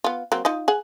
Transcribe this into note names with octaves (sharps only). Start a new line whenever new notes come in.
B3 F4
F#3 A#3 C4
D#4 F4 D#5
G#4 F#5